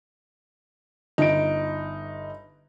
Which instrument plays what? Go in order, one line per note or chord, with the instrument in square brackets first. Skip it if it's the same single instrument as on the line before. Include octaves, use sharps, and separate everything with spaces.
[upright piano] G1 D7 [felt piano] D#4